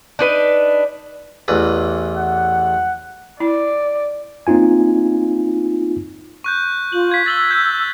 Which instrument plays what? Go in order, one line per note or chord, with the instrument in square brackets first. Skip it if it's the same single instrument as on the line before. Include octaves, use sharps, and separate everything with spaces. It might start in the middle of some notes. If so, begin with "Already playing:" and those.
[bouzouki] D4 D#4 B4
[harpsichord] A1 E2 B4
[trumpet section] F#5
[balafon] E4 [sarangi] D5
[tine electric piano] A#3 C4 D#4 F4 G#5
[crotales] C#6 F#6 G6
[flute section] F4 [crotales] F#7
[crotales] G#6 B6
[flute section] E6 [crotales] A6 F#7 G7
[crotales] G6 B6